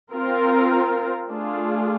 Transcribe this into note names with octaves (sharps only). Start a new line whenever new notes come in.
C4 F4 A#4
A3 D4 F4 G#4